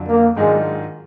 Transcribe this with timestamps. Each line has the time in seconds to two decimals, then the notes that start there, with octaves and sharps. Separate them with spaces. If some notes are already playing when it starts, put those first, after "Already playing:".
Already playing: F2 D3 F#3
0.08 A#3
0.37 G#2 D#3 F#3 G#3 D4 F4